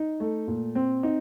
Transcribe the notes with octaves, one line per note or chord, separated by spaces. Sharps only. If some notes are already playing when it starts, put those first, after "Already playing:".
Already playing: D#4
A3
A#2
C4
D#4